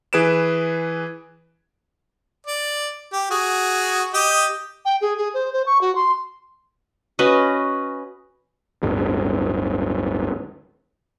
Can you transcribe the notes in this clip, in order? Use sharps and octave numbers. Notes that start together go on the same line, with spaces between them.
E3 G#4 B4 D7 E7
D5
G4
F#4 G#4
G4 D#5 G5
G5
G#4
G#4
C5
C5
C#6
F#4
C6
C#4 F#4 B4 D#5
D1 G1